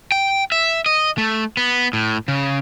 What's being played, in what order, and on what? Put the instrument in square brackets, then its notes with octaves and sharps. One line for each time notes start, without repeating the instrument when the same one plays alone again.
[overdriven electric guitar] G5
E5
D#5
A3
B3
A2
C#3